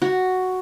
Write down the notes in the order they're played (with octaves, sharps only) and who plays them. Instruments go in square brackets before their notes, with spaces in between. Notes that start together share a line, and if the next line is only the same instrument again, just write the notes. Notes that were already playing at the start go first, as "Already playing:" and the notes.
[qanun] F#4